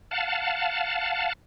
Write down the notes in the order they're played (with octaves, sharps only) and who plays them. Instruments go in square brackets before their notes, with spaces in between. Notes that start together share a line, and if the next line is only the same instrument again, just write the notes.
[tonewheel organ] F5 F#5 A5